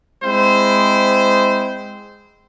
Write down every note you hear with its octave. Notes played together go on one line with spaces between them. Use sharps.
G#3 C4 E4 C5